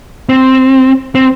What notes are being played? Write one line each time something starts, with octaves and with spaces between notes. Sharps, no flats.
C4
C4